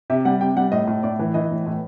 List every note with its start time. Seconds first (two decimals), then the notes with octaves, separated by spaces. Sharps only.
0.10 C3 E5
0.25 G3 F#5
0.41 C3 G5
0.57 G3 F#5
0.72 A2 D#5
0.88 A2
1.03 A2 D5
1.19 E3
1.34 E3 D#5
1.51 A2
1.67 A2